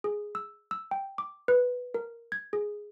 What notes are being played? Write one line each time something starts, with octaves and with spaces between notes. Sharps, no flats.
G#4
E6
E6
G5
D6
B4
A#4
G#6
G#4